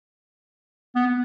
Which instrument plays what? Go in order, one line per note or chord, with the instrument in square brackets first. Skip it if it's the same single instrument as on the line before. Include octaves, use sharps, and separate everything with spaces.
[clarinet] B3